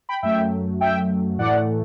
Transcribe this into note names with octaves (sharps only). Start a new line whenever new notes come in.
G5 B5
F#2 F#3 A3 E5 G5
E5 G5
A2 E3 A3 D5 F#5